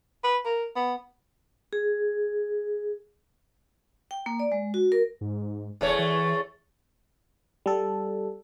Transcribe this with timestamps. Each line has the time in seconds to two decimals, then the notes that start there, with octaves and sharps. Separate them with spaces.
0.24 B4
0.45 A#4
0.76 B3
1.73 G#4
4.11 G5
4.26 A#3
4.39 D5
4.52 G#3
4.74 F#4
4.92 A#4
5.21 G#2
5.81 D#1 E2 A3 C#5
5.99 E3
7.66 G3 A4